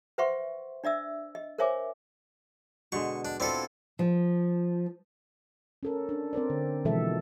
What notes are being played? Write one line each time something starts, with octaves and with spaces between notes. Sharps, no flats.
B4 C5 E5 F#5 C6 C#6
D4 D5 E5 E6
D#5
A#4 C5 C#5 E5 G#5 D6
B2 D3 G#3 C#6
D4
C4 D4 E4 F4 A4
F3
C#4 A4 A#4
D4
C4 A#4 C5 D5
D3
B2 E3 F3 G#3 A4 E5